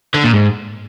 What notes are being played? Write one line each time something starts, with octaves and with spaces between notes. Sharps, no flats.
D3
A#2
G#2